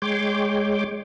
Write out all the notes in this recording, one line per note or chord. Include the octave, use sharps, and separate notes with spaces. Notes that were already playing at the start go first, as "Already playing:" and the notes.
G#3 C#5 G5 C6 D6